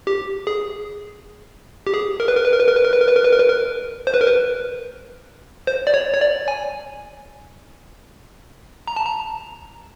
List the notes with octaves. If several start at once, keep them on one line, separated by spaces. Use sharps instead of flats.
G4
G#4
G4
G#4
A#4
B4
A#4
B4
A#4
B4
A#4
B4
A#4
B4
A#4
B4
A#4
B4
A#4
B4
A#4
C5
B4
A#4
B4
C5
D5
C#5
C#5
D5
G#5
A#5
A5
A#5